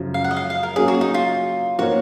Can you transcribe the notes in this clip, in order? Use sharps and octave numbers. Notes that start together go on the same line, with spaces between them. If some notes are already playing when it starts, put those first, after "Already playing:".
Already playing: F#2 C#3 F3
F5
F#5
D#5
F5
F5
A#4
F#3 A#3 C#4 G#4
F#4
D#4
F4
F3 A#3 D#4 F#4 A#4 C#5